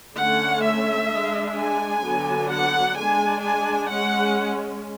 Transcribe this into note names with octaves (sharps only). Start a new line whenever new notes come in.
D3 A3 C#4 F#5
E5
G#3 D4
G#5
D3 F#3 B3 D4
F#5
G#3 D4 G#5
G#5
G#3 C#4 F#5